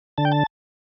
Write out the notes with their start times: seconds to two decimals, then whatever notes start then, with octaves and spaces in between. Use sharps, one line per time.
0.18 D3 A5
0.25 G5
0.32 A5